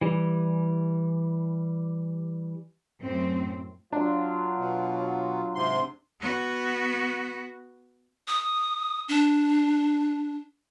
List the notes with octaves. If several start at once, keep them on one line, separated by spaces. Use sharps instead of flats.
E3 G3
F#2 A2 C4
F#3 D4 F4
B2
G#2 C3 C6
B3 F#4
D#6
D4